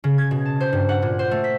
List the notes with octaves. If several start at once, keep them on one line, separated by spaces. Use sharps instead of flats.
C#3
G#6
B2
A5
C5
G2
F#5
A#2
C5
A3
B6